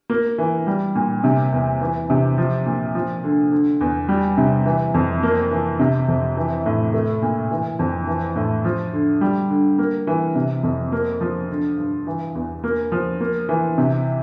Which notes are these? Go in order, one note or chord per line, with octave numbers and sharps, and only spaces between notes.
A#3
E3
G3
A#2
C3
E2
E3
C3
F3
A#2
F3
D3
D3
E2
G3
C3
E3
F2
A#3
E3
C3
F2
E3
A2
A3
A#2
E3
F2
E3
A2
F3
D3
G3
D3
A#3
E3
C3
F2
A#3
F3
D3
G2
E3
E2
A#3
F3
A#3
E3
C3